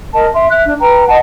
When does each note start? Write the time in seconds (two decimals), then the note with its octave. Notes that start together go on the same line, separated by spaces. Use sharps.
0.14 A#4 D#5 A5
0.34 E5 C6
0.50 E5 F#6
0.64 D4
0.80 B4 G5 A#5
1.08 D#5 F#5 A5